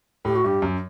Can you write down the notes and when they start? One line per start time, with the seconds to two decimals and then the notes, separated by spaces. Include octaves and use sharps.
0.25 A2 G4
0.35 F#4
0.44 G2 G4
0.62 F#2